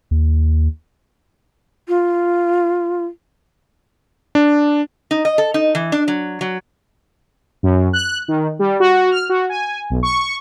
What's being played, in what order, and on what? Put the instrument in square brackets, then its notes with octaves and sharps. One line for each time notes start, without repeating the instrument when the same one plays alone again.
[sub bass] D#2
[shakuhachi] F4
[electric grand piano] D4
[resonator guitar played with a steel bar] D#4
D#5
A4
D#4
E3
D4
F#3
F#3
[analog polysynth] F#2
F#6
D#3
G3
F#4
F6
F#4
G#5
B1
C#6